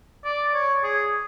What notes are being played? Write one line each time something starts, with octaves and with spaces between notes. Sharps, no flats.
D5
C#5
G#4